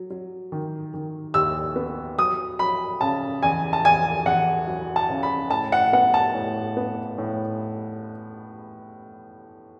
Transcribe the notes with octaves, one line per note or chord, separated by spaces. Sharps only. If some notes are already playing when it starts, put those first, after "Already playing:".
Already playing: F#3
F#3
D#3
D#3
D#2 E6
B3
F#3 D#6
F#3 B5
C#3 A5
E2 G#5
A5
E2 G#5
E2 F#5
F#3
A5
C#3
B5
A2 A5
F#5
B3 F#5
A5
A2
B3
A2